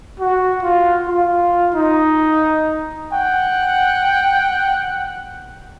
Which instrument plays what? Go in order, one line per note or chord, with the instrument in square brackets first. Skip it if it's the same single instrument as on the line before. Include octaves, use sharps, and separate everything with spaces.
[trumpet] F#4
F4
F4
D#4
[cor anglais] F#5 [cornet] G5